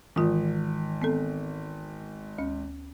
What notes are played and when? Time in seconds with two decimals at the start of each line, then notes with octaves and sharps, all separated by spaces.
0.16 G#1 E3 F4
1.02 B3 C4 A4
2.38 D2 C#4